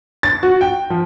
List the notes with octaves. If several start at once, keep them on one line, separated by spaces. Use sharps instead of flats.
A6
F#4
G5
F3